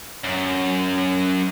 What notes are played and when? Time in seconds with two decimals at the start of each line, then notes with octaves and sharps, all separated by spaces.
0.24 F#2